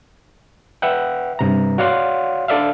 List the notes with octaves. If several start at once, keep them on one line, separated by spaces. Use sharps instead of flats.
B4 E5 F#5 G5
G2 C3 A#5
F#4 C#5 D5 F5 F#5 C6
D4 A4 D5 E5 F5